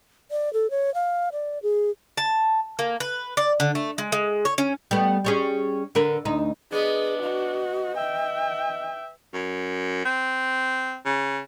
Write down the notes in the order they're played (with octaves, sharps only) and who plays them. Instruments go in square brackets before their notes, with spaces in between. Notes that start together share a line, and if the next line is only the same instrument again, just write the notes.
[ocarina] D5
A4
C#5
F5
D5
G#4
[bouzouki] A5
A#3
B4
D5
D3
A3
G#3
G#3
C#5
C#4
[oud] G3 A3 B3
G3 C#4 G#4
D3 A#4 B4
D2 D#4
[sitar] B3 [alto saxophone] D4 [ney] G#4 [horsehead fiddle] D#5
[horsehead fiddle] F#4 [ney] D#5
[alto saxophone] E5 [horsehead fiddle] G5
[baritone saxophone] F#2
C4
C#3